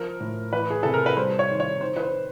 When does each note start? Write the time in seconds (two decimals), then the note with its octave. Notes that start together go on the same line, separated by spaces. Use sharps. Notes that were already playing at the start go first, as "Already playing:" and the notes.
Already playing: F3 A#4
0.20 A2
0.53 E3 B4
0.70 G#4
0.83 C3 A4
0.94 A#4
1.06 B4
1.17 G3 C5
1.39 C#5
1.50 D#3
1.60 C#5
1.81 D#3 C5
1.97 B4
2.02 C5